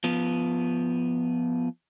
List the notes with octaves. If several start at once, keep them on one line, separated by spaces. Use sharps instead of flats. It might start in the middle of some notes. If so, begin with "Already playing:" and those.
F3 B3